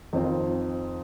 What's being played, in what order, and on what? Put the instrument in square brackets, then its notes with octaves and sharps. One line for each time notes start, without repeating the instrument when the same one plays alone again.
[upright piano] F2 D#3 C4 F4